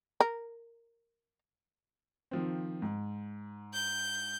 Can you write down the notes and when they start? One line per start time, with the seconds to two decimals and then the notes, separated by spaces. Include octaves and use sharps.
0.20 A#4
2.31 D#3 F3 C4
2.82 G#2
3.74 G6